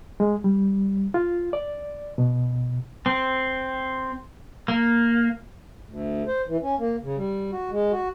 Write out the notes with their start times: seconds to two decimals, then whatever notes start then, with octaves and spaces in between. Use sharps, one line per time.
0.20 G#3
0.44 G3
1.14 F4
1.53 D5
2.18 B2
3.06 C4
4.68 A#3
5.87 D2
6.28 C5
6.48 E3
6.63 C#4
6.79 A#3
7.03 C#3
7.17 G3
7.52 F#4
7.71 G#3
7.92 F#4